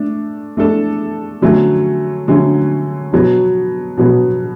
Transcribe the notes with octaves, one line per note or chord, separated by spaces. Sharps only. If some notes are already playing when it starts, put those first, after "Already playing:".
Already playing: A3 D4
A3 D4 A4
D3 F#3 A3 C#4
D3 F#3 A3 C#4
B2 F#3 B3
B2 F#3 B3